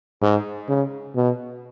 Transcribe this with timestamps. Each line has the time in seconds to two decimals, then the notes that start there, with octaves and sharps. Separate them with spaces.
0.22 G#2
0.68 C#3
1.16 B2